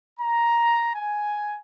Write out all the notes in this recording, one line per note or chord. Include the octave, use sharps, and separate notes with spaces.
A#5
G#5